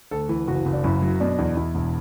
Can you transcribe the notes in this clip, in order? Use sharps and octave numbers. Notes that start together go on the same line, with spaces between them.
D2 A4
E3
F#1 F#4
F#1
D4
F#2 E4
F#3
B2 D4
E2
E2 E4
E1